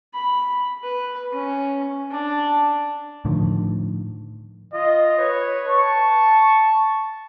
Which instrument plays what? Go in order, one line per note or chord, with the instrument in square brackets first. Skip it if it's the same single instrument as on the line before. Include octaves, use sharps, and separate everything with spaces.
[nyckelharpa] B5
B4
C#4
D4
[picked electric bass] A2 D3 D#3 F3
[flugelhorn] F4 [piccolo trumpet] D#5
[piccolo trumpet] B4 [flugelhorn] C#5
[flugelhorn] A5 [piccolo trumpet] C#6